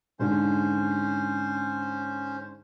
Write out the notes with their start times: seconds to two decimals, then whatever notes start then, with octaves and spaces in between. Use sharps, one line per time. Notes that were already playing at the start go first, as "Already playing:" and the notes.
0.19 G#2 D3 C#4 C5